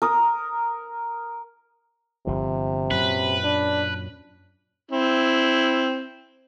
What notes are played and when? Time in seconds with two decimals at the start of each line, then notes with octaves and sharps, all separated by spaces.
0.02 A#4 D#6
2.27 G1 C3 F3
2.91 F#2 A#2 F#3 B4
3.44 D4
4.91 C4 E4